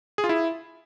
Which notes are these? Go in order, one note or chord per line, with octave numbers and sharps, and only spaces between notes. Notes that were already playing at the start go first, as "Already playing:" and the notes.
G#4
F4
E4